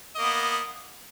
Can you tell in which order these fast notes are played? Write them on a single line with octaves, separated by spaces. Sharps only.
D#5 A#3 B3